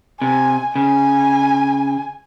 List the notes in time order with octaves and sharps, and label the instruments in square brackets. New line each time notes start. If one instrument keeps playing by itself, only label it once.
[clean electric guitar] C3 [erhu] G#5
[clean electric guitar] C#3 [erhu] G#5